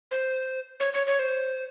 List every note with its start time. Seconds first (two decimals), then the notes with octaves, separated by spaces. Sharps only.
0.11 C5
0.80 C#5
0.94 C#5
1.07 C#5
1.19 C5